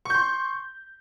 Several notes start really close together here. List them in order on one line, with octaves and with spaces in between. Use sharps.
C#6 G6 C6